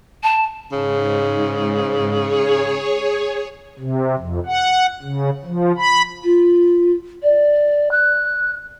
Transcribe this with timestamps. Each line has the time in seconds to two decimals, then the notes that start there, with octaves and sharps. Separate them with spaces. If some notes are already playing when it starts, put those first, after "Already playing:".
0.23 A5
0.72 G#2 C#3
2.15 G#4 C#5
3.79 C3
4.18 F2
4.46 F#5
5.02 C#3
5.45 F3
5.77 B5
6.23 F4
7.23 D5
7.91 F#6